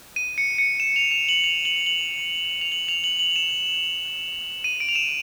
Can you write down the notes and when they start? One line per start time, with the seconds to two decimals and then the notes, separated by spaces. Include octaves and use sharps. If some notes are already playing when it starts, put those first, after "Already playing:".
0.16 D#7
0.38 C#7
0.58 C#7
0.80 E7
0.96 F7
1.11 F7
1.29 F#7
1.44 F7
1.65 F#7
1.86 F#7
2.61 F7
2.72 F#7
2.88 F7
3.04 F#7
3.19 F#7
3.36 E7
4.64 D#7
4.80 D7
4.89 F7
4.95 E7